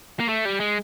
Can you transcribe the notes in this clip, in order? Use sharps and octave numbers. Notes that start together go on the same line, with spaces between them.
A#3
A3
G3
G#3